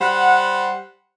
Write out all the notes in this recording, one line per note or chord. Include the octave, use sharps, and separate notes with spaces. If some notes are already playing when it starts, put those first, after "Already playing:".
G3 C5 F#5